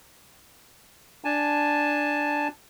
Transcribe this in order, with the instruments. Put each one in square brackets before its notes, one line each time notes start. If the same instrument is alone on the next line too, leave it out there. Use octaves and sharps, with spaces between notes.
[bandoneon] D4 G#5 A5